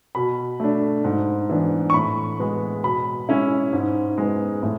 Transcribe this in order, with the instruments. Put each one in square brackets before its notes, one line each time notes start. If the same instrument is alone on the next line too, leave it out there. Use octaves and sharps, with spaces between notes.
[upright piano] B2 B5
A3 D4
G#2
E3 B3 D4
C#6
A2 B5
G#3 B3
B2 B5
G#3 C#4 E4
G#2
G#3 B3
A2